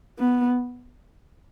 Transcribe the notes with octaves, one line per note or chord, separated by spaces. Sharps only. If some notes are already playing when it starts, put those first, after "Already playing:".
B3